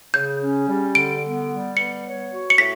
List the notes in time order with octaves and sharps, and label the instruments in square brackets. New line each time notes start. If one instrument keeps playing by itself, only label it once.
[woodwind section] C#3 [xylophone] G6
[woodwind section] C#4
G3
[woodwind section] D3 [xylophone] D7
[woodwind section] B3
G3
[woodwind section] B3 [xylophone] C#7
[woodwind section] C#5
F#4
[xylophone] C#7
[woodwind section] A2 [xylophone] B6